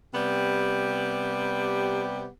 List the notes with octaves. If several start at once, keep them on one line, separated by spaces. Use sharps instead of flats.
C3 G3 B3 G4